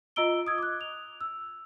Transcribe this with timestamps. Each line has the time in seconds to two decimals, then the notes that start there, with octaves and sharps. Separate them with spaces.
0.16 F4 D#5 A#5 E6 D7 G7
0.46 D#6 E6 G#6
0.58 D6 F#6
0.81 F7
1.21 E6